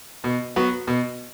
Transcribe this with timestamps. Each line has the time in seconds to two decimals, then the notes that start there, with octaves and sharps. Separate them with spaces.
0.24 B2
0.56 F#3 B3 F#4
0.87 B2